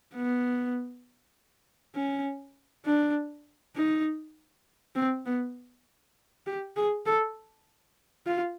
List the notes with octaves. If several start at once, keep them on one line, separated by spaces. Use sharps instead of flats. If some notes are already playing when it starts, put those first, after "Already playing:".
B3
C#4
D4
D#4
C4
B3
G4
G#4
A4
F4